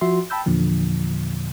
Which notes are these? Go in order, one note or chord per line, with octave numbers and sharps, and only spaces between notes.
F3 F#4 E5 C6
G5 A5 B5 E6 G6
E2 A#2 D3 F3